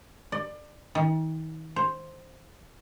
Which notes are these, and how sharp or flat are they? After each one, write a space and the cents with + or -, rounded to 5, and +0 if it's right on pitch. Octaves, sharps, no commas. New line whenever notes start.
D5 +25
D#3 +40
C5 +5